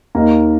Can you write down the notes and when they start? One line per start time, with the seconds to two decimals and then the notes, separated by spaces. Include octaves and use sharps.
0.15 D#2 A#3